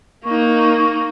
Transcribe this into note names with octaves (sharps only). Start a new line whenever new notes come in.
A#3 D#4 C#6